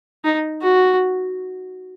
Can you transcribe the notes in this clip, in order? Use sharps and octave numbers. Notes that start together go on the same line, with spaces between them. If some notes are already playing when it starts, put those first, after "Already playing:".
D#4
F#4